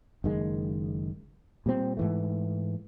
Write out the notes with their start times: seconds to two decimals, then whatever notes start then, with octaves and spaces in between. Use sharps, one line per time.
0.24 F#1 D#3 G#3
1.66 A#2 G3 C4
1.97 G#2 E3 A3